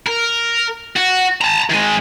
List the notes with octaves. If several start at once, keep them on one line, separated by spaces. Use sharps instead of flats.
A#4
F#4
A5 A#5
D#3 G#3